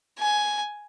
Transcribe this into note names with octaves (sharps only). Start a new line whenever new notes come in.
G#5